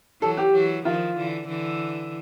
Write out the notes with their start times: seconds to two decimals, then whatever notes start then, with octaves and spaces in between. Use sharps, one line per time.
0.22 E3 F#3 A4
0.37 G4
0.53 E3 F#3
0.85 D#3 F3 F4
1.17 D3 E3
1.48 D3 E3